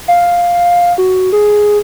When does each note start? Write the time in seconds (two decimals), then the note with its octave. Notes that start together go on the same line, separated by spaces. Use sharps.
0.08 F5
0.98 F#4
1.32 G#4